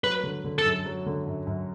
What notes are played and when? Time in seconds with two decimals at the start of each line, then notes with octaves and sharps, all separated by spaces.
0.04 F#3 B4
0.23 D3
0.44 D3
0.58 A4
0.65 F#2
0.86 F#3
1.06 D3
1.27 F#2
1.47 F#2